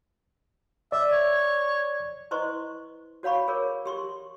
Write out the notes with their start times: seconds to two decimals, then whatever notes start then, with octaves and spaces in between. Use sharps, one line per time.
0.92 D5 E5
1.12 C#5
2.31 E4 B4 C5 D#5 C6 C#6
3.23 F#4 C#5 F5 B5 C#6
3.48 G#4 A#4 C#5
3.86 G4 C6 C#6